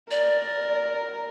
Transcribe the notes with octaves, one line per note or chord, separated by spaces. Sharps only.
A#4 D5